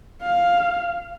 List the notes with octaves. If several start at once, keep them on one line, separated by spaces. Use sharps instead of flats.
F5